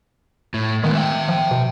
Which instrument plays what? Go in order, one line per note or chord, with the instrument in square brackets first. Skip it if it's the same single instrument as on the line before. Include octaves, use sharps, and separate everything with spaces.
[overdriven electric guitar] A2
[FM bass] D#3 [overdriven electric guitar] G#3 B3
[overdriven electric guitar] E5 G5
[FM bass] F3
B2